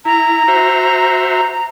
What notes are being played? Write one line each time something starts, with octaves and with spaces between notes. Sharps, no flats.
E4 A#5
F#4 C5 E5